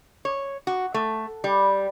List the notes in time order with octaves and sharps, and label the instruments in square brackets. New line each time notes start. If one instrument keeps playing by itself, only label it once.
[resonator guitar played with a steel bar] C#5
F#4
A3
G3